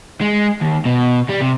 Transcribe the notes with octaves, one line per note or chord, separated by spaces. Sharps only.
G#3
D#2
B2
G3
C3